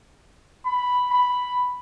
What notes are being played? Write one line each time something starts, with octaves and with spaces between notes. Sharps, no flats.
B5
B5